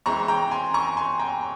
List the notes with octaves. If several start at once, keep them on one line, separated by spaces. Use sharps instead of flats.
E3 G#3 C4 A#5 C#6
G5 A#5
G#5 C6
A#5 C#6
G#5 C6
G5 A#5